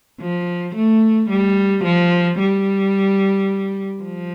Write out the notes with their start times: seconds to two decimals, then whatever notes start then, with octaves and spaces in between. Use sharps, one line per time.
0.21 F3
0.76 A3
1.30 G3
1.84 F3
2.39 G3
4.03 F3